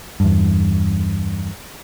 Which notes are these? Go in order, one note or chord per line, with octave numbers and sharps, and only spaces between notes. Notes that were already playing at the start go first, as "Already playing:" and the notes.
E2 G2